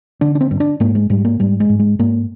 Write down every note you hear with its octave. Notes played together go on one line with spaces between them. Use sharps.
D3 D4
D4
C4
G2
D4
G#2 A#3
G#3
G#2 G3
A#3
G#2 G3
G#3
G#2
G#3
G#2 A#3